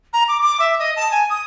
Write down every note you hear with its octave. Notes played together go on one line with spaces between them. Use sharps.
A#5
D6
D6
E5
D#5
A5
G#5
D#6